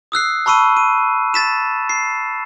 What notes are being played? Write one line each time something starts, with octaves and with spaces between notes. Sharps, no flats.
D#6 E6 F#6 C7
A5 B5 C#6 E6 D#7
D#7
A6 B6 E7
C7